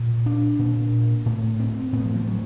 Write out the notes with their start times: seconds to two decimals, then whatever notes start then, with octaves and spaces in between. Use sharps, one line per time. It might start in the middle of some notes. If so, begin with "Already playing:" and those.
Already playing: A#2
0.26 D4
0.59 A#2
1.26 A2
1.60 C4
1.93 A2 B3
2.04 F3
2.16 F3
2.26 F#3